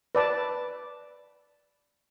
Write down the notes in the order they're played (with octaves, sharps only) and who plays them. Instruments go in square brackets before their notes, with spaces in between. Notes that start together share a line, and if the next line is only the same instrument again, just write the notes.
[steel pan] B4 D5 A5